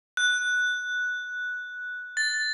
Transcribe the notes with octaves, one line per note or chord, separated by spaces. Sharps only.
F#6
A6